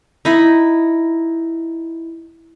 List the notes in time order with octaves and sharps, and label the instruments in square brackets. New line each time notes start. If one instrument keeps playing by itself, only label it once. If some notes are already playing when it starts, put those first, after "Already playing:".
[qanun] D#4 E4